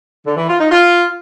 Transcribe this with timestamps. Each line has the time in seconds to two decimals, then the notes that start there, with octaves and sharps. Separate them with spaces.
0.25 D3
0.36 E3
0.48 F4
0.59 D#4
0.71 F4